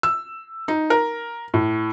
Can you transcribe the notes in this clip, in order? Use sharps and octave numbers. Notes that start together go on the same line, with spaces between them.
E6
D#4
A#4
A2